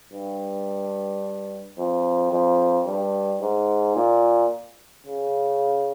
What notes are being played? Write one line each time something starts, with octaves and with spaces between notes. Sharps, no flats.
G2
F2
F2
G2
G#2
A#2
C#3